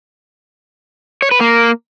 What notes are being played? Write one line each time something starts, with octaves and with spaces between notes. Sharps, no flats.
C#5
B4
A#3